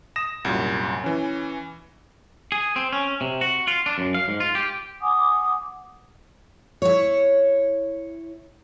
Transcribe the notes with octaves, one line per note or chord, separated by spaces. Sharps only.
D#6 A#6 E7
C2 F#2 A#2
E3 C#4
G#4
C4
C#4
C3
F#4
F4
D4
F#2
F5
G#2
F4
G4
F#5 G#5 D6 D#6
E4 C#5